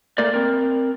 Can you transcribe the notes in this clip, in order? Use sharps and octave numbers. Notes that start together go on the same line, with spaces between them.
A3 A#3 A#4 D5
C4 A#4